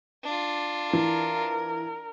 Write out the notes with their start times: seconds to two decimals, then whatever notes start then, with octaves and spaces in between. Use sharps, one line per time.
0.24 D4 F4
0.93 E3 A#4